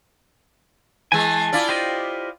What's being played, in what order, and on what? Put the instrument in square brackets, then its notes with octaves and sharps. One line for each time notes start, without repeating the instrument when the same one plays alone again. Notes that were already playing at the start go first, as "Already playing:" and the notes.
[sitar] E3 G#3 [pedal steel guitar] G#5 A5
[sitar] E4 F4 D5
[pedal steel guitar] G4 C5 D#5